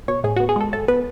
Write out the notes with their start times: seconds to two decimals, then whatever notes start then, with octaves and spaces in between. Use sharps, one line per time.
0.08 B2 C#5
0.24 A2 G#4
0.36 F#4
0.40 B3
0.49 G#4
0.56 G#3 A4
0.73 A2 A4
0.88 B3 B4